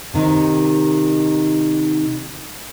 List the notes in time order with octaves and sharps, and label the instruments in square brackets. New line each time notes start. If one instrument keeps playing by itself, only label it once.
[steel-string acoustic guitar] C3 D#3 D#4